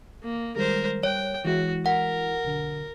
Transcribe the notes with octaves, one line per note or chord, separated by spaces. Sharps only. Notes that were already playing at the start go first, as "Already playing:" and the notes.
A#3
D#3 G3 G#3 A#4 C5
G3 C#5 G5
E3 G#3 E4 F#4
A#4 F#5
B1 D3